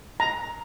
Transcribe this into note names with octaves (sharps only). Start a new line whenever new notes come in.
A#5